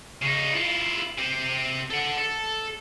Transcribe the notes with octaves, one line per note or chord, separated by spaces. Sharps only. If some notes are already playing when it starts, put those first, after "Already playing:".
C#3 D#4
E4 F4
C3 C4
A4 F#5
A4